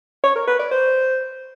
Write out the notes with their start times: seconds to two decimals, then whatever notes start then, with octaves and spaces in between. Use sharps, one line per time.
0.24 C#5
0.35 A#4
0.47 B4
0.59 D5
0.71 C5